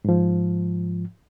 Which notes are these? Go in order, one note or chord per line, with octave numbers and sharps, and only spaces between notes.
G#2 F3